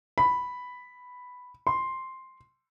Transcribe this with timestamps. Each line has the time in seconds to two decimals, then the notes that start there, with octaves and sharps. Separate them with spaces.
0.18 B5
1.67 C6